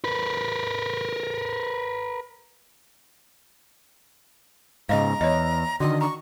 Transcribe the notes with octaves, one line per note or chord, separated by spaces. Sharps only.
A#4 B4
G#2 C#3 D#5 F5 A#5
E2 C#5 D#5
D3 D#3 F#4 D#5
A#5 C#6